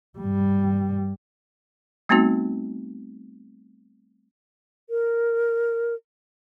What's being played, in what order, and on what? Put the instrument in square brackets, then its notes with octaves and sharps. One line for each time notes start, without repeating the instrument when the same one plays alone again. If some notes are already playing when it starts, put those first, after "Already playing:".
[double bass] G2 G3
[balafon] G3 A3 B3 C4 D#4 F#4
[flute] A#4